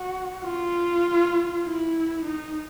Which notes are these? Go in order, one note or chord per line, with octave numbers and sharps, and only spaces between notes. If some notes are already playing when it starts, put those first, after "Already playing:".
Already playing: F#4
F4
E4
D#4